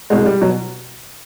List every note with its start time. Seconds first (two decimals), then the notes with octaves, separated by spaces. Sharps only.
0.10 C2 B2 G#3
0.26 G3
0.41 B2 F#3